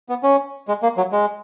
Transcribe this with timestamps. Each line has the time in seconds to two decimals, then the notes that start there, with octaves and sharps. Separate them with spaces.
0.09 B3
0.23 C#4
0.68 G#3
0.83 A#3
0.97 F#3
1.12 G#3